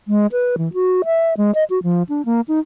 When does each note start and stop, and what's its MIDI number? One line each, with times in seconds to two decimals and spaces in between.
0.08 0.26 56
0.32 0.56 71
0.58 0.72 52
0.73 1.02 66
1.05 1.34 76
1.37 1.53 56
1.54 1.64 75
1.70 1.82 66
1.83 2.03 53
2.09 2.24 62
2.25 2.41 58
2.48 2.59 63